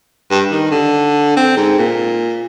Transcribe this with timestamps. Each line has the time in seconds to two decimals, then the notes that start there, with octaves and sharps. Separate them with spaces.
0.31 G2
0.51 D#3
0.71 D3
1.37 C4
1.57 G#2
1.78 A#2